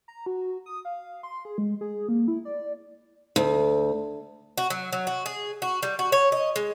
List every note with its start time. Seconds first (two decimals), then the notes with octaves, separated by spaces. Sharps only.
0.08 A#5
0.26 F#4
0.66 D#6
0.85 F5
1.23 C6
1.45 G#4
1.58 G#3
1.81 G#4
2.09 A#3
2.28 E4
2.45 D5
3.36 D2
4.58 F#4
4.70 F#3
4.93 F#3
5.07 F#4
5.26 G#4
5.62 F#4
5.83 G3
5.99 F#4
6.12 C#5
6.32 D#5
6.56 G#3